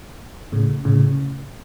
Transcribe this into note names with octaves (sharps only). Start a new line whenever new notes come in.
A2 C#3
A2 C#3